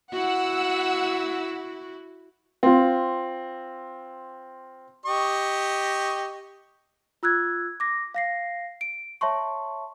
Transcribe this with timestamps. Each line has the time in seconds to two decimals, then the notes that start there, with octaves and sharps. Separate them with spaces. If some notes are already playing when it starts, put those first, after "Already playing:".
0.12 E4 F#4 F#5 E6
2.63 C4 F4
5.05 G4 D#5 C#6
7.23 F4 E6 F#6 G#6
7.80 D6 A#6
8.14 F5 A#6 C7
8.81 D7
9.21 C#5 E5 A5 C6 C#6